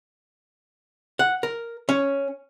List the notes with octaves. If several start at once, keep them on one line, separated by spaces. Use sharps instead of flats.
F#5
A#4
C#4